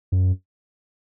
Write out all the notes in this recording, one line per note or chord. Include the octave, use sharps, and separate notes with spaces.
F#2